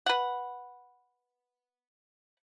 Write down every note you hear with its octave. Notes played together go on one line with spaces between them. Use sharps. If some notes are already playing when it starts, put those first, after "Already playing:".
B4 F#5